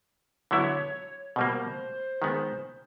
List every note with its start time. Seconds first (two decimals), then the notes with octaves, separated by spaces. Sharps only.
0.51 D3 F#3 B3 E4 C#5
1.36 B2 G3 A#3 C5
2.22 D#3 G#3 B3